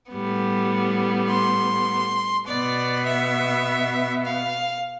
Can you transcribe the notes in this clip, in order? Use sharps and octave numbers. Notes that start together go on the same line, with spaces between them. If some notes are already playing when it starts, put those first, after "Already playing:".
A2 G3 B3
C6
B2 B3 D5
E5
F5